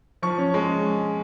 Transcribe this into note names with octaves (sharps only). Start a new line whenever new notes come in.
F3 C#6
C#4
G#3